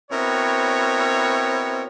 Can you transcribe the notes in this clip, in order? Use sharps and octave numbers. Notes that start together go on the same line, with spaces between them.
B2 C4 E4 A#4 C#5